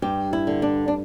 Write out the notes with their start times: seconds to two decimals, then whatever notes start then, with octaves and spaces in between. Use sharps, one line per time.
0.02 G2 G4
0.33 E4
0.47 D3
0.62 D4
0.88 D4